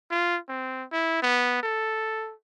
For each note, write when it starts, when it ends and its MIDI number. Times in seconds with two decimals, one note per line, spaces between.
0.11 0.38 65
0.49 0.84 60
0.92 1.20 64
1.22 1.61 59
1.63 2.33 69